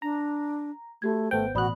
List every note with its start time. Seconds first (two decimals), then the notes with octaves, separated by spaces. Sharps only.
0.02 D4 A#5
1.02 A3 F#4 G4 G#6
1.31 G#1 A3 B3 C5 G5
1.55 A1 B2 F#4 D5 B5 D#6 F#6